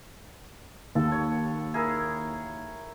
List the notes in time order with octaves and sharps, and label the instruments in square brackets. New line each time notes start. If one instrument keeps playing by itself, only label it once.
[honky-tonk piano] D#2 [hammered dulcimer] A4
[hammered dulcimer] C#5
E4 G#4 A#4